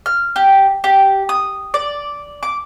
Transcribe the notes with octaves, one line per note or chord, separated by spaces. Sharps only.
F6
G4
G4
D#6
D5
D6